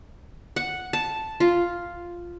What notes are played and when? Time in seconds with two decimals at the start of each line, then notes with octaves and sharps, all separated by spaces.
0.56 F#5
0.93 A5
1.40 F4